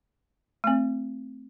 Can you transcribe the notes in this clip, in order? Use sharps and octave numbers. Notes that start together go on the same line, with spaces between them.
A3 C4